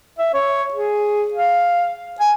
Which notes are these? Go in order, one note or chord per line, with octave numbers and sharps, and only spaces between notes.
E5
C#5
G#4
F5
G#5